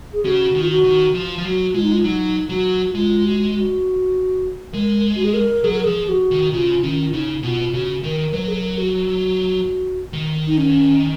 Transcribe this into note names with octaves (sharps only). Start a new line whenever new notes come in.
G#4
C#3 F#4
D#3
F4
F#4
D#3
F3
F3
F#3 F#4
G#3 F4
D#4
F4
F#3 D#4
F#3 F#4
G#3 F4
F#4
F#4
G#3 A#4
F#4
G#4
A#4
F#3 G#4
A#4
F3 G#4
F#4
D#3
C#3 F4
D#3 C#4
F4
C#3 D#4
B2 F4
C#3 F#4
D#3 A#4
F#3 B4
A#4
G#4
A#4
F#4
D#3
D#4
C#4